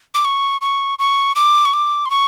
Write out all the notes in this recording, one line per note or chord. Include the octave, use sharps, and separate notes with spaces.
D6
C#6
C#6
C#6
D6
C#6
D6
C6
C#6